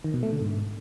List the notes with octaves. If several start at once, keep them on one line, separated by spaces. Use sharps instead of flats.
D#3
B2
A3
D3
G#2